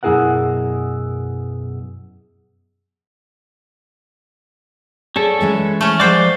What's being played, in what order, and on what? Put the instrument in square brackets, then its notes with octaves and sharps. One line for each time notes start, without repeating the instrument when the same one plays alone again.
[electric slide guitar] F#2 B2 E4 G#4 A#4 F#5
[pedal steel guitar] C#4 A4 [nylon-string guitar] G#4 D5
[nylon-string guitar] E3 G#3 C#5
[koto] A3 C#4
[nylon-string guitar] F3 G#3 [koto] F#4 C5 G5 [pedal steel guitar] D5 D6